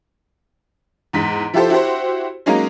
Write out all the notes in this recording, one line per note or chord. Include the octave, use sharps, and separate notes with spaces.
E2 G#2 B6
F3 E4 F4 G4 A4 C5
E4 F#4 G4 C5
F#3 G#3 A#3 C#4 D#4